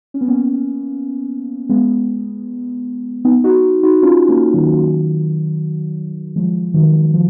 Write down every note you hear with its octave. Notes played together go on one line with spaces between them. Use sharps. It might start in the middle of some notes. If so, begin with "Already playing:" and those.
C#4
B3
A#3 C#4
G#3 B3
B3 D#4
D#4 F#4
D#4 F#4
C#4 F4
A#3 C#4
D#3 F#3
F3 G#3
D#3 F#3
F3